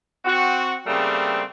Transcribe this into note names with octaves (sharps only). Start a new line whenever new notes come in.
C4 F#4
C#3 G3 A3 A#3 C4